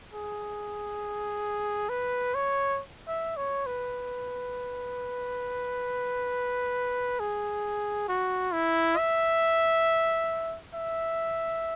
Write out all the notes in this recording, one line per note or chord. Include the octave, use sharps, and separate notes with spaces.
G#4
B4
C#5
E5
C#5
B4
G#4
F#4
E4
E5
E5